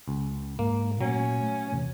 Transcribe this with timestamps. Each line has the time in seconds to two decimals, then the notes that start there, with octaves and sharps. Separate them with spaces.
0.08 C#2
0.59 G#2 A#3
1.01 A#2 F#3 A3 C#4
1.43 A3
1.72 E2 C3 E3